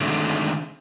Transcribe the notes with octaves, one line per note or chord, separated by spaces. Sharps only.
D3 D#3 G#3 A3 C4 D4